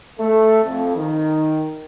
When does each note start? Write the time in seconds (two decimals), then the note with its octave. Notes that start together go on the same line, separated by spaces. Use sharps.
0.18 A3
0.65 F2
0.96 D#3